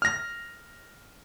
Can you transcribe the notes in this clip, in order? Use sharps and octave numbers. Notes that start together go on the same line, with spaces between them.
F6 A#6